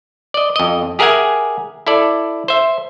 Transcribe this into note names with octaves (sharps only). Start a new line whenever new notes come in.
D5 D#5
F2 D#5
G4 G#4 A#4 E5 F#5 G#5
E4 A4 D5
C5 E5